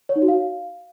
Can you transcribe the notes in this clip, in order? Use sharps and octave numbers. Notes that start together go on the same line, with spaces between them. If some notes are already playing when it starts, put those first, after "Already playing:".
C#5
D#4
F#4
F5